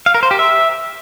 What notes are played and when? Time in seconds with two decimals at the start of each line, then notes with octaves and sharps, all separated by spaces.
0.06 F5
0.14 A#4
0.23 C5
0.31 G4
0.39 E5